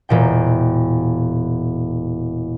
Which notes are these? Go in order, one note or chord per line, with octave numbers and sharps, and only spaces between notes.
E1 A#2 G5